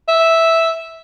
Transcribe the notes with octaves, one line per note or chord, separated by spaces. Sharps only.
E5